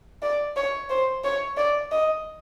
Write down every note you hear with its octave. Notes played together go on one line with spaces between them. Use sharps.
D5
C#5
C5
C#5
D5
D#5